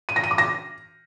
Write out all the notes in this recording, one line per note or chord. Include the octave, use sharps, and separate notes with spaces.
D#7
A#6
D#7
D6
A#6